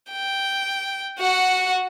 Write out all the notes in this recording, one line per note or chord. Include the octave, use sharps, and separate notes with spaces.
G5
F#4 F#5